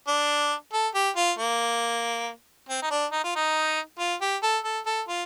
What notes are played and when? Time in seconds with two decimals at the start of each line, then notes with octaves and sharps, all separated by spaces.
0.08 D4
0.73 A4
0.95 G4
1.16 F4
1.39 A#3
2.69 C4
2.82 D#4
2.91 D4
3.12 D#4
3.24 F4
3.36 D#4
3.99 F4
4.22 G4
4.43 A4
4.64 A4
4.86 A4
5.08 F4